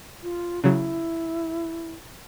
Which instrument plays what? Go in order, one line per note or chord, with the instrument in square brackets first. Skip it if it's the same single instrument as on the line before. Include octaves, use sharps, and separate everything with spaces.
[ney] F4
[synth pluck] C#3 F#3 [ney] E4